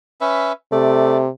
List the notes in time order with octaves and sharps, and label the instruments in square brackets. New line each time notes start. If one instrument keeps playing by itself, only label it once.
[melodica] C#4 B4 E5
[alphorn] C3 [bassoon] A3 [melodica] D5